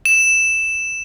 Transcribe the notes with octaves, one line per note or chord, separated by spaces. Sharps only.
E7